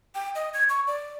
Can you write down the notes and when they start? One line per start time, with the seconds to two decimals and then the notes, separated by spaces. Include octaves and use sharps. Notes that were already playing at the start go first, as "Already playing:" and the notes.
0.15 G5
0.35 D#5
0.54 G#6
0.69 C#6
0.87 D5